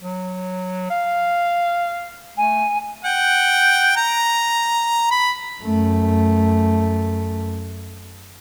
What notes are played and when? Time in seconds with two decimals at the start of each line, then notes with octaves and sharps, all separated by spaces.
0.02 F#3
0.90 F5
2.37 A3 G#5
3.05 F#5 G5
3.96 A#5
5.11 B5
5.62 F#2 A3